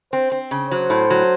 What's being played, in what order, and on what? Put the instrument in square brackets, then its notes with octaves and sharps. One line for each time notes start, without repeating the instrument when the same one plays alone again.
[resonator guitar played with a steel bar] C4 [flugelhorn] C5
[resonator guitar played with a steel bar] C4
C#3
[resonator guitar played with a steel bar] F#3 [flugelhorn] C5
[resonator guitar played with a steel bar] A2
F#3